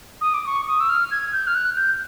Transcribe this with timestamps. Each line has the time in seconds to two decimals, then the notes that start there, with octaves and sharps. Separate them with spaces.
0.21 D#6
0.34 D6
0.46 C#6
0.68 D#6
0.80 E6
0.89 F6
1.11 G#6
1.33 G6
1.47 F6
1.55 F#6
1.76 G6